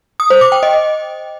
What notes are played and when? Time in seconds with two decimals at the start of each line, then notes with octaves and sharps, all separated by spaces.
0.20 D#6
0.30 C5
0.41 D6
0.52 G5
0.63 D#5